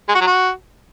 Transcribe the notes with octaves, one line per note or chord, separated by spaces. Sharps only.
G#3
F#4
F#3
F#4